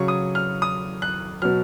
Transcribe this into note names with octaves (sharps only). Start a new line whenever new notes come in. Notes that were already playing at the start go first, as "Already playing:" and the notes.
Already playing: C#3 F#3 C#6
D#6
F6
D#6
F#6
B2 F#3 F6